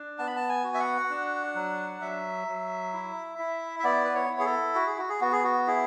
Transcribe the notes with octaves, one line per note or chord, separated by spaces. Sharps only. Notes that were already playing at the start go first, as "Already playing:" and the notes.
Already playing: D4
B3 A5
B5
A5
G#5
F#4
E5
F#5
D4
F#3
F#3 E5
F#3
E4
E4
E5
B3 D5
B4
C#5
E4
G#4
A4
F#4
G#4
F#4
G#4
B3 F#4
G#4
F#4
E4 G#4